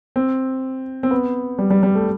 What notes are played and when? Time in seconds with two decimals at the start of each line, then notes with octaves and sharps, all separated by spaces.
0.16 C4
1.03 C4
1.11 B3
1.59 G3
1.70 G3
1.83 G3
1.95 A3